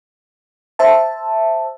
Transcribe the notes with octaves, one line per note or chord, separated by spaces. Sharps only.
C5 E5 A5